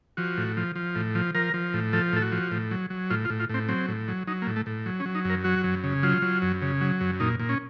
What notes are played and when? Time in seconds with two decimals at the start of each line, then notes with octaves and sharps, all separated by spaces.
0.17 F3 F#4
0.38 A2
0.57 F3
0.76 F3
0.96 A2
1.15 F3
1.35 F3 A#4
1.54 F3
1.74 A2
1.93 F3 A4
2.13 A2 A4
2.22 F#4
2.32 F3
2.52 A2
2.71 F#3
2.90 F#3
3.10 A2 F4
3.25 F4
3.30 A2
3.40 F4
3.49 A2 C4
3.68 F#3 C4
3.89 A2
4.08 F#3
4.27 F#3 D#4
4.42 A#3
4.47 A2
4.56 A3
4.66 A2
4.86 F#3
5.00 C#4
5.05 F#3
5.15 D#4
5.25 F#2 A#4
5.44 F#3 F#4
5.64 F#2
5.84 C#3
6.03 F#3 F4
6.22 F#3
6.42 F#2
6.62 C#3
6.81 F#3
7.01 F#2
7.20 A#2 D#4
7.39 A#2
7.49 C#4